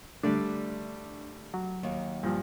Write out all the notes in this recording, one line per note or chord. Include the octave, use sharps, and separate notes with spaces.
D3 G3 A3 D4 D5
F#3
D#2 D#3
G2 A#2 F3